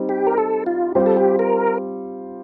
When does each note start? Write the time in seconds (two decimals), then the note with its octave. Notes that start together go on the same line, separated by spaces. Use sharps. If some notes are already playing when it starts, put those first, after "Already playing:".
Already playing: G3 C4 D#4
0.09 G4
0.27 A#4
0.38 A4
0.66 F4
0.95 G3 C4 F4 G4 C5
1.06 A4
1.16 G4
1.39 A#4